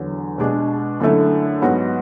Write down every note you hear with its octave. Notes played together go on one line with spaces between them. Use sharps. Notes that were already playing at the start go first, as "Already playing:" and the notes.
Already playing: E2 D3 F#3
B2 G#3 D4
F#2 D3 A3 E4
G#2 F#3 B3 F#4